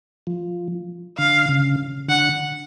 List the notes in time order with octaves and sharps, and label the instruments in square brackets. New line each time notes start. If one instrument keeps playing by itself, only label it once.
[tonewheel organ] F3
[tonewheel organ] D3 [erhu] F5
[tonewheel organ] C#3
[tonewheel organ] D3 [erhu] F#5